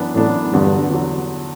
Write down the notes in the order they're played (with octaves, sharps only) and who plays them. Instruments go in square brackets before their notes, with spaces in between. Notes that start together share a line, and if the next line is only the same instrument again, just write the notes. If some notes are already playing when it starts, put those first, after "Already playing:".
Already playing: [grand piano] F#2 E3 B3 D4
[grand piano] F#2 E3 B3 D4 [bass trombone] A2
[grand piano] E2 D3 F#3 [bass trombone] G2
[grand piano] E2 D3 F#3